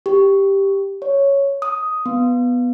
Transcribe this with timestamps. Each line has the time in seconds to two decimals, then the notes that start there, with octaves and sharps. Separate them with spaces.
0.06 G4
1.02 C#5
1.62 D#6
2.06 B3